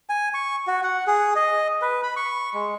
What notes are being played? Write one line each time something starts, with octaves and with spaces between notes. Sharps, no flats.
G#5
C#6
F#4
F#5
G#4
D#5
B4
B5
C#6
G#3